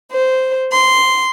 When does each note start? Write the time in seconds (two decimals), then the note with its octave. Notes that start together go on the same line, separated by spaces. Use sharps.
0.10 C5
0.70 C6